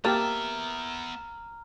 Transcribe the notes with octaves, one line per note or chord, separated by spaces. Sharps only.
A#3 B3 G4 E5 A5 A#5 F6